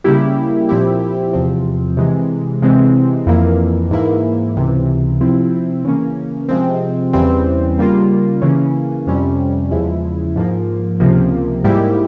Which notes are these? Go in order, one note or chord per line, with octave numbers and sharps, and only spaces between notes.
C#3 G3 A#3 E4 G4
A#2 F3 C4 E4 G4
E2 C3 F3 C4
C3 E3 G#3
C3 E3 G#3 C4
F2 E3 A#3
G#2 E3 A#3 E4
C#2 C3 E3
C3 F3 C4 E4
C#3 E3 A#3 C#4
C3 F3 G#3 C4
E2 C#3 E3 G3 C4
C#3 G3 A#3 F4
C#3 E3 A#3 C#4
F2 C3 G3 C#4
E2 C#3 F3 G#3 E4
G#2 F3 A#3
C#2 C3 F3 A#3
G#2 G3 A#3 E4 G4